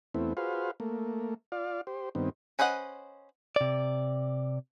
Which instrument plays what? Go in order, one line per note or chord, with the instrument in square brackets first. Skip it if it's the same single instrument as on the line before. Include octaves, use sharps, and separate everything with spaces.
[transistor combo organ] E2 A3 B3 C4 E4
F4 F#4 G#4 B4 C5 F5
A3 A#3
F4 D5 F5
G4 C5
G2 D#3 B3 C4
[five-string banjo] C#4 B4 C5 D#5 F#5
[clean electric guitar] C3 D5